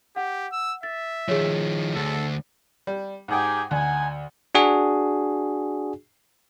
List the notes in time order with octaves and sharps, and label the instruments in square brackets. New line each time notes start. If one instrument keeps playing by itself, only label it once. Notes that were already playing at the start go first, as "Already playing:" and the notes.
[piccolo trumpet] G4 [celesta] F#5
[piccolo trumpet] E6
[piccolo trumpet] E5 [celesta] A6
[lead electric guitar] D#3 F3 [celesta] G#4 C#5
[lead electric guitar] D2 [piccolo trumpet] A4
[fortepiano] G3
[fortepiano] G#2 F#5 G5 [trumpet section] D#4 G4 G#4
[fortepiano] D2 [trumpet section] D#4 F#5 G#5
[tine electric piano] D4 F#4 G#4